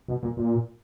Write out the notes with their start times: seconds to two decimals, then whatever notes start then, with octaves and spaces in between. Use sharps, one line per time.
0.08 B2
0.23 A#2
0.37 A#2